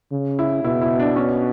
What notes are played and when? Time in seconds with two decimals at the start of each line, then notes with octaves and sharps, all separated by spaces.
0.12 C#3
0.39 E4
0.64 B2 E4
0.81 E4
0.99 D4
1.16 C#4